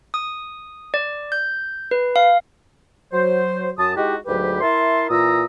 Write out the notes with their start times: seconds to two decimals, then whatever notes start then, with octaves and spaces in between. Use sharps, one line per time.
0.14 D#6
0.94 D5
1.32 G6
1.91 B4
2.16 F5
3.12 F#3 C5
3.78 F#2 A5 D#6
3.96 G#3 D#4 E4 F#4 G4
4.26 D2 G#2 F#3 G4 B4
4.61 E4 A#4 E5 A5 C6
5.09 A#2 E3 F4 A#5 D#6 E6